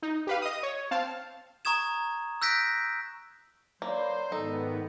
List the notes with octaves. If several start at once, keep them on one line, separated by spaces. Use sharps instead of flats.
D#4
G4 B4 F5
D#5 D#6
C#5
C4 F5 A5
A#5 C#6 D#6 G#6 E7
E6 F#6 G6 A#6 B6 D7
F#3 A#3 C5 D5 B5
G#2 D#3 B3 D#4 A4